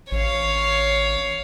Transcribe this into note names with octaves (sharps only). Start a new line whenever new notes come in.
A1 C#5 F5